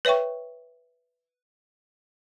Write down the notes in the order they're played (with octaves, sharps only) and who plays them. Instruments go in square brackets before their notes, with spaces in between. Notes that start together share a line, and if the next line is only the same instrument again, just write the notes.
[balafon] B4 C#5 E5 G5 C#6